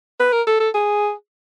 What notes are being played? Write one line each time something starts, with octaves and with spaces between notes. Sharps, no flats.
B4
A#4
A4
A4
G#4